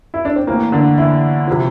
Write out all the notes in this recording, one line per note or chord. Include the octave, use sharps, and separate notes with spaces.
E4
D4
C4
A2 E3 A#3
D3 D4
E3 E4
C3 F3